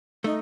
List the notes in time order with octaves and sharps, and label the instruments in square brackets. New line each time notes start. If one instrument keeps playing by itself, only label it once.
[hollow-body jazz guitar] A3 [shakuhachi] D#4